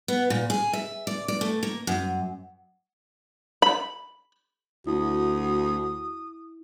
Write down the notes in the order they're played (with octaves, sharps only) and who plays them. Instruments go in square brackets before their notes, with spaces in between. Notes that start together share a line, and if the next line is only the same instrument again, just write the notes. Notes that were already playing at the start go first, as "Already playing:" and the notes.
[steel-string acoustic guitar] B3
A#2
G#4
E5
D5
D5
A3
A#3
F#2
[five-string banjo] B5
[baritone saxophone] D2 [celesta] E4 [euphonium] F#4 [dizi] D#6